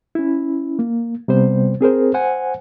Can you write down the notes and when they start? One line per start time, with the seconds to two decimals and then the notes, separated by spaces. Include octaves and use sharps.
0.15 C#4 E4
0.79 A#3
1.28 C3 G3 B3 C5
1.81 C4 G#4 A#4 C5
2.14 C5 F#5 G#5